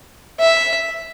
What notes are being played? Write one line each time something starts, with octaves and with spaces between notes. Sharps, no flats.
E5